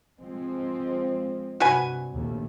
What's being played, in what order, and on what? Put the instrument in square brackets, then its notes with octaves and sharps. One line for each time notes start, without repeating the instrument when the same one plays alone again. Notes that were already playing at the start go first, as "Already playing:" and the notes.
[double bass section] F3 G#3 C4
[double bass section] G2 C3 [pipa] F#4 B4 G#5
[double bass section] A#1 D#2 A3